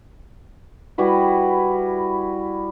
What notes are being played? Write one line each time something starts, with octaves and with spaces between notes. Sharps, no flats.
G3 E4 F#4 B4